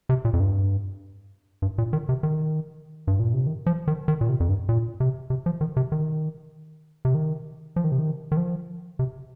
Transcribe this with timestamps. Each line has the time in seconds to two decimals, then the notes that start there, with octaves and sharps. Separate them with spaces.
0.09 C3
0.25 A#2
0.33 F2
0.40 G2
1.62 G2
1.78 A#2
1.93 D#3
2.09 C3
2.23 D#3
3.07 G2
3.19 A#2
3.34 C3
3.47 D#3
3.66 F3
3.88 D#3
4.08 D#3
4.21 A#2
4.29 C3
4.40 F2
4.49 G2
4.69 A#2
5.00 C3
5.30 C3
5.46 F3
5.61 D#3
5.77 C3
5.92 D#3
7.05 C3
7.15 D#3
7.76 F3
7.84 D#3
7.92 C3
7.99 D#3
8.32 D#3
8.37 F3
8.99 C3